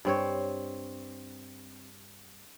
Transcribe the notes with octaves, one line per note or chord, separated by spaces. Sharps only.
G2 C4 C#5